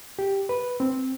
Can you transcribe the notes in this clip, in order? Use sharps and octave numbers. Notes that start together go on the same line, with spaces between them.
G4
B4
C4